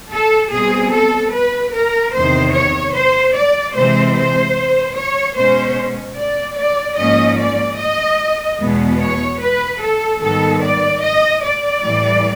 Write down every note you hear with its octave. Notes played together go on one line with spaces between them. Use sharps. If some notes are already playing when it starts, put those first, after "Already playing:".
A4
B2 G3 C4 G#4
A4
B4
A#4
E2 C3 D#3 C5
C#5
C5
D5
C3 E3 G#3 C4 C5
C5
C#5
B2 G#3 C#4 C5
D5
D5
G#2 F3 A#3 C#4 D#5
D5
D#5
E2 B2 G#3 B3
C#5
B4
A4
G#2 D#3 G3 B3 A4
D5
D#5
D5
A2 E3 G3